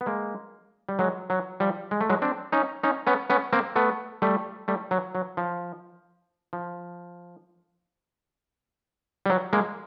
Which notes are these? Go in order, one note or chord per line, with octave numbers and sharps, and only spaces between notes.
B3
G#3 A#3
G3
F#3 G#3
F#3
F3 G3
G#3
A3
F#3 G#3
C4 D4
C#4 D#4
C#4 D#4
B3 C#4
B3 C#4
A#3 C4
A3 B3
G3 A3
G3 A3
F#3
F#3
F3
F3
G3
F#3
G#3 A#3